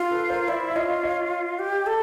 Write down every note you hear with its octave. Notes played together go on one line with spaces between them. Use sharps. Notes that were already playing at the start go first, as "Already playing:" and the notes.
Already playing: F4
A4 B4
A#4 C5
E4 C5 D5
E5
F4 C#5 D#5
C#5 D#5
G4
A4